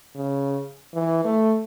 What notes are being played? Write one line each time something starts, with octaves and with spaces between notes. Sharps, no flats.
C#3
E3
A3